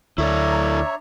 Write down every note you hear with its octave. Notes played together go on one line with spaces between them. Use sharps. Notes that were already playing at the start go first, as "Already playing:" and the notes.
D2 D4 E4 A4 C#5 D5 E5 A#5